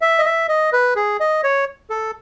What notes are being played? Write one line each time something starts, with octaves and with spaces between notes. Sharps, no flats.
E5
D#5
E5
D#5
B4
G#4
D#5
C#5
A4